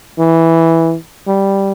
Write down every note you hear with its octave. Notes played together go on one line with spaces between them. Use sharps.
E3
G3